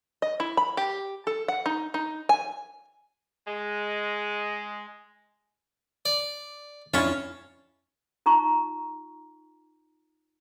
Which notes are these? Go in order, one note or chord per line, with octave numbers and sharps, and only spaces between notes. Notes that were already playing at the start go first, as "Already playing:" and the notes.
D#5
E4
B5
G4
A4
F#5
D#4
D#4
G#5
G#3
D5
F2 C#4 D4 E4 F4 C#5 A5
D#4 F4 A#5 C#6